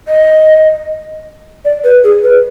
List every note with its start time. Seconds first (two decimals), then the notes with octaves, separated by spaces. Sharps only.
0.08 D#5
1.65 D5
1.84 B4
2.04 G#4
2.23 B4